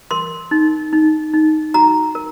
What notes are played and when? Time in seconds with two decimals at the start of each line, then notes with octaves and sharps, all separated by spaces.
0.11 A#4 C6
0.51 D#4
0.93 D#4
1.33 D#4
1.74 F#4 A#5
2.15 A#4